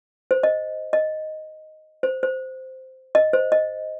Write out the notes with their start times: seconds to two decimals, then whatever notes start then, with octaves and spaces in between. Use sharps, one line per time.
0.31 C5
0.43 D#5
0.93 D#5
2.03 C5
2.23 C5
3.15 D#5
3.33 C5
3.52 D#5